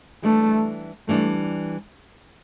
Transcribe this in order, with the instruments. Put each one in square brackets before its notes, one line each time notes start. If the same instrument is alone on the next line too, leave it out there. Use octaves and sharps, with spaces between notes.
[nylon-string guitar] E3 G3 D4 [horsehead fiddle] A3
[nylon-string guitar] E3 G3 D4 [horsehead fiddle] A3